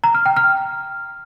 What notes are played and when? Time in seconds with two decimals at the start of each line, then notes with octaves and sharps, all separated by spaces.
0.04 A#5
0.15 F6
0.26 G5
0.37 F6